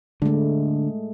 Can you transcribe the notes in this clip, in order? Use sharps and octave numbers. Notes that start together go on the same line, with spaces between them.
D3 G#3 A3